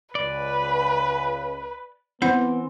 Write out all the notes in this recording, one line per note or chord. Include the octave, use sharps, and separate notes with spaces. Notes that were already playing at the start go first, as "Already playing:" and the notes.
C#2 B4 D5
E3 B3 C4 E4 C5 F#5